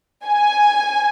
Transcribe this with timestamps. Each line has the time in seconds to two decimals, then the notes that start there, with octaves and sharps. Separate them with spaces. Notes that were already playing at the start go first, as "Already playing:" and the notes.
0.27 G#5